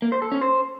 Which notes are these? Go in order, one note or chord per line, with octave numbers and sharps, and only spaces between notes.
A#3
C5
A4
C#4
C5